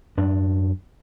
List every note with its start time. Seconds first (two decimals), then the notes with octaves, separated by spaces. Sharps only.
0.17 F#2 D4